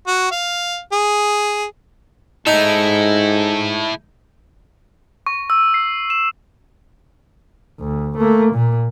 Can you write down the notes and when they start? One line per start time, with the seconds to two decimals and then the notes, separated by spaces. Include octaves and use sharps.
0.07 F#4
0.32 F5
0.92 G#4
2.47 G#2 D#4 E4 A4
5.27 C#6
5.50 E6
5.74 C7
6.10 E7
7.80 D2
8.18 A3 A#3
8.54 A#2